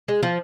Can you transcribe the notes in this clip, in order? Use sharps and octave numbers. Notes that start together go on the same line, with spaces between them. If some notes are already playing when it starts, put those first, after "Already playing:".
G#3
F3